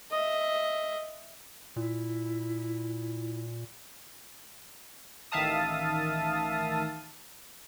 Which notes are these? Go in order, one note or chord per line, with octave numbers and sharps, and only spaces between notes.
D#5 E5
A#2 E4
A1 D#3 E5 F5 A5 D#6